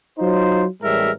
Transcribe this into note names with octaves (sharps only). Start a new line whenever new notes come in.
F#3 D#4 F4 C5
A1 A2 G3 G#3 A#4 E5